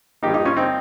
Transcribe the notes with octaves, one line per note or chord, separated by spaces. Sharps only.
G2 F3 A#3 D#4 G4
D#4 G4
C#4 F4
C4 D#4